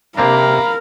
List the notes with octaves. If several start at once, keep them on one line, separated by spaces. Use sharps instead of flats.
C3 A#3 C4 D4 A#4 F5 A#5 B5